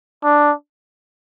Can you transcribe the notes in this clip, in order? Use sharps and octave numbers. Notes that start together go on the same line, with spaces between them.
D4